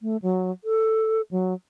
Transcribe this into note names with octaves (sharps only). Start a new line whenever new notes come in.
A3
F#3
A4
F#3